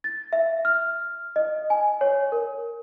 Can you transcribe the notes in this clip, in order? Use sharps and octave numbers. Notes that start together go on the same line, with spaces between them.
A6
E5
F6
D#5
G#5
C#5
A#4